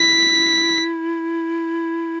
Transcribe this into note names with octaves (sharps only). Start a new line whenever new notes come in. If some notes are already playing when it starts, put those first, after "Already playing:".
Already playing: E4 B6